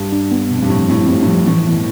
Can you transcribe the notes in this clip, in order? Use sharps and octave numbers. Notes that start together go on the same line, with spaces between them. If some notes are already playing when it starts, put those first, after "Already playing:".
Already playing: G2
D4
B3
F2 B2
G2
A2 F3
A2 E4
F2
G2 C4
A2
G2 F3
A2 E3
B2 E4